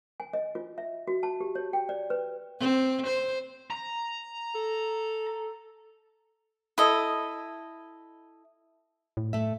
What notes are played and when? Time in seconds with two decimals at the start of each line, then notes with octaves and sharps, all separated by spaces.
0.20 G#5
0.33 D#5
0.55 F4
0.78 E5
1.08 F#4
1.23 A5
1.40 G4
1.55 C#5
1.73 G5
1.89 D5
2.10 B4
2.60 C4
3.07 C5
3.70 A#5
4.55 A4
6.78 E4 A4 D#5
9.17 A2
9.33 A3 E5